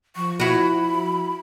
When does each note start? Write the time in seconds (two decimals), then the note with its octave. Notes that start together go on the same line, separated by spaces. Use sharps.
0.16 F3 C#6
0.40 E4 F#4 B5